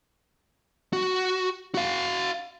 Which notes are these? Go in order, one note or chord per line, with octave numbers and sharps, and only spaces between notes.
F#4
F#4 F5